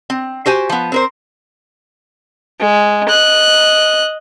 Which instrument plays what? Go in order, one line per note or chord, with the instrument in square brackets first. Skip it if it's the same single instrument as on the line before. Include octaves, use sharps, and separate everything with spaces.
[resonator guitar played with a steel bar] C4
F#4 G4 C5 G#5
F3 B3
C4 A#4 C5
[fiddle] G#3
D#5 F#6